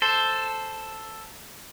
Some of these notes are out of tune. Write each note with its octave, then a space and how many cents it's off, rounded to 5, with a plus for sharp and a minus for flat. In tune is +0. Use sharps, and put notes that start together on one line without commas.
A4 +0 C5 +0